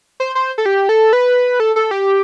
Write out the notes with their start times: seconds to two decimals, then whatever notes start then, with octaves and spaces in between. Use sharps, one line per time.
0.20 C5
0.35 C5
0.58 A4
0.66 G4
0.89 A4
1.13 B4
1.60 A4
1.76 A4
1.91 G4